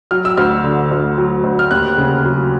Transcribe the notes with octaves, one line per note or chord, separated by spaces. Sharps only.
F#3 F6
E6
D2 F6
D3
D2
F#3
D2
F6
D#2 F#6
C#3
F#3